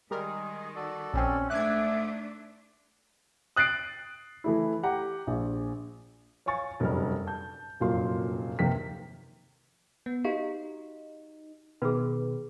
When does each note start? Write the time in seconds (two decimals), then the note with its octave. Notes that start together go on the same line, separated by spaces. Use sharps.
0.11 D#3 G3 G#3 G#4 A#4
0.76 F#4 A4 D5
1.14 A#1 C4 C#4
1.50 G#2 A3 D4 E5 D6 F#6 G#6
3.56 D#6 F#6 A6 C7 D7
4.44 E3 A3 E4
4.83 G4 F#5 G5 A#5
5.27 A#1
6.46 C#5 F5 G#5 C#6 A6
6.80 F1 F#2 G3 F6
7.27 A5 G6
7.80 F1 F#2 A#2 F#3 F5 C6
8.59 D#2 C3 D#3 A#4 G5 B6
10.06 B3
10.24 D#4 F#4 G4 F5
11.82 B2 D#3 G#4 B4